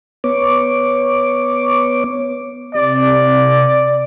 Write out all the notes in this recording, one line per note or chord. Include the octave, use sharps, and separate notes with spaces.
B3 C#5 D6
C3 D5